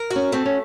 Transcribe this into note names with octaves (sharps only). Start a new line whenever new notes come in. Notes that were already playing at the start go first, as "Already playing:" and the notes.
Already playing: A#4
F#4
C#4
A3 C4
C#4